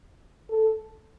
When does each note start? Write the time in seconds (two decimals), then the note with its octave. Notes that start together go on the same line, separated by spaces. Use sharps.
0.49 A4